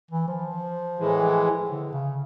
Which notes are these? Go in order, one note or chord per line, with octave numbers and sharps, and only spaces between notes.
E3
F3
A2 E3 G#3
D3
C#3